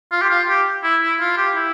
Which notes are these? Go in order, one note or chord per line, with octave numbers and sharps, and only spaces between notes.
F4
G4
F4
G4
E4
E4
F4
G4
E4